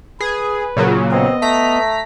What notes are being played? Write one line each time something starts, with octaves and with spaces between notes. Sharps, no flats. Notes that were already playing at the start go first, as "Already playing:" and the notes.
G#4 B4
A#2 C#3 F#3
B3 C4 D#5
A3 A#5 B6